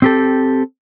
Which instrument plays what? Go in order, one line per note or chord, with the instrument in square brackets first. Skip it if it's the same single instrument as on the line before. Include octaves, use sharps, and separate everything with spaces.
[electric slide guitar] C4 G4 A4